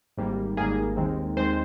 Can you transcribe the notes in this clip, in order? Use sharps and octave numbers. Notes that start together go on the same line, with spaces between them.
G#1 G#2 G3 A#3
G#1 G#2 G3 A#3 G#4
D#2 D#3 G#3 C4
D#2 D#3 G#3 C4 C5